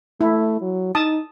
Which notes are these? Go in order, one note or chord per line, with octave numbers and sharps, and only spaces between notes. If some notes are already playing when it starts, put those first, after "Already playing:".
A3 E4
F#3
D#4 A5 D#6